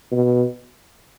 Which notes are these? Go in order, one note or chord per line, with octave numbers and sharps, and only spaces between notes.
B2